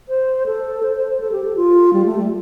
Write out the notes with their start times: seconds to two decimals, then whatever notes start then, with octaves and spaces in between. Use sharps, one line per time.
0.09 C5
0.46 A4
0.83 C5
0.95 C5
1.08 C5
1.20 A4
1.32 G4
1.44 A4
1.56 F4
1.93 G3
2.06 A3
2.18 G3